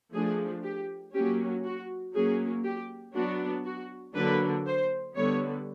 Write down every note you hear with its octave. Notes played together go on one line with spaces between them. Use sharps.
F3 A3 D4 G#4
G4
F#3 A#3 C#4 G4
F#4
F#3 A#3 C#4 G#4
G4
F#3 B3 D4 F#4
F#4
D3 F#3 A#3 D4 B4
C5
D3 G3 B3 C#5